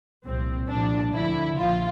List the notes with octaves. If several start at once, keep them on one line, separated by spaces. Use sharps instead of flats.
C2 A#2 F3 C4
C2 A#2 F3 D4
D2 D3 F3 E4
A#1 A#2 F3 F4